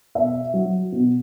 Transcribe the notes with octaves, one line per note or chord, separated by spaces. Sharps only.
B2 E5
F#3
B2